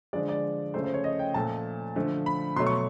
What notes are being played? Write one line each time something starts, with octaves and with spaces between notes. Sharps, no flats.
D3 F3 G#3 D5
D5
C#3 F3 A3 C5
C5
C#5
D#5
G5
A#2 F3 A3 A5
D3 F3 A3
B5
B2 F#3 A3 C6
C#6